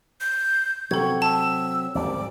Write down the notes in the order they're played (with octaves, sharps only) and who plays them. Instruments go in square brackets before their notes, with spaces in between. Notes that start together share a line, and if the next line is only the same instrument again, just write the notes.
[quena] G6
[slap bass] C3 F#3 [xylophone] A4 G#6 [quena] C#6
[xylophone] A5 [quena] E6
[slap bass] G#1 D2 G3 [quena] D6